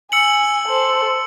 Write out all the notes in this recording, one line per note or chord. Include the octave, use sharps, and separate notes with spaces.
G#5 E6 C#7 F#7
A4 C5